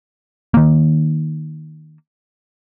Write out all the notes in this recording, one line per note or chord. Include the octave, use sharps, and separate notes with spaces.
D#3 A#3